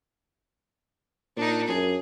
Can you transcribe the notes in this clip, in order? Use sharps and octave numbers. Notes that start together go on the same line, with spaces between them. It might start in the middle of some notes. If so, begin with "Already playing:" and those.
A#2 D4 D#4
F#2 G#4